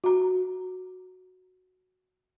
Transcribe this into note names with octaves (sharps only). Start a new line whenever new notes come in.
F#4 A#5